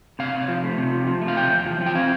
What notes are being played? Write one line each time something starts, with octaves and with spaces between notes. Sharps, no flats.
C3 F5
C3
F3
A3
C3
F3
F3
A3
F5
C3 G5
E2
F3
F3
G5
C4 F5